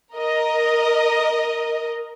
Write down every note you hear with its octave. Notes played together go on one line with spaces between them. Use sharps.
A#4 D#5